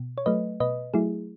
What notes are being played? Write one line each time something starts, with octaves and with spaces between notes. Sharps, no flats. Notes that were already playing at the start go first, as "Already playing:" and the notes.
Already playing: B2
C#5
F#3 A3 B4 D#5
B2 B4 D#5
F#3 A3 E4 G#4